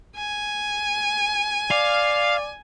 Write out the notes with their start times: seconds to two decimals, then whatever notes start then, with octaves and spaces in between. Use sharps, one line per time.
0.16 G#5
1.71 D5 F5